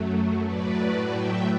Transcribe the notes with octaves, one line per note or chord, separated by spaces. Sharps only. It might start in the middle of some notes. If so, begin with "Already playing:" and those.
Already playing: F#2 F#3 A3
A2 F#3 A3 B4 D5
E5 G5